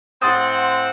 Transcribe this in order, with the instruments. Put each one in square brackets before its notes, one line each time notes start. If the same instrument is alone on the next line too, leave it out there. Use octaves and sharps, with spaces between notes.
[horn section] A2 C4 F#5 [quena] C6 [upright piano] D#6 A6